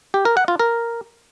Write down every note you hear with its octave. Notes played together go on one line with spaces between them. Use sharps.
G4
A#4
F#5
F4
A#4